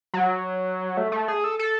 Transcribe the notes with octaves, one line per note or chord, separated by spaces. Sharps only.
F#3
A3
A3
G#4
A4
A4